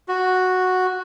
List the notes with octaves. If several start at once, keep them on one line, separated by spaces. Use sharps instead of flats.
F#4